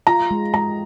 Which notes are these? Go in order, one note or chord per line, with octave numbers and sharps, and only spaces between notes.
F4 A#5
G#3
G#3 A#5